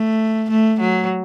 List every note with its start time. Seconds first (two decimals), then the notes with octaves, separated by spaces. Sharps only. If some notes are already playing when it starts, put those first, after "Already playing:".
Already playing: A3
0.50 A3
0.80 F#3